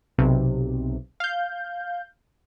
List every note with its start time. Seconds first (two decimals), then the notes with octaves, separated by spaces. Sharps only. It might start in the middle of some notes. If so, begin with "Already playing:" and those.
0.18 B1 C3
1.20 F5 G6